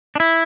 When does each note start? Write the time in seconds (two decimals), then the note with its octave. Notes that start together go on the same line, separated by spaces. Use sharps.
0.15 D4
0.20 E4